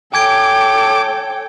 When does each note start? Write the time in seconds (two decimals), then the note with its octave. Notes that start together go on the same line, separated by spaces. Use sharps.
0.14 A4 C#5 G5 G#5 D6 G#6 D7